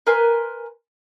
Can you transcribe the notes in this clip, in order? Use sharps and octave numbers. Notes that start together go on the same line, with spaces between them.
A#4 B4 G#5 C6